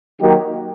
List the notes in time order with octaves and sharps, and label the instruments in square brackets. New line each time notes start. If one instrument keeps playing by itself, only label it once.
[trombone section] D#3 F#3 A#3 D#4 G4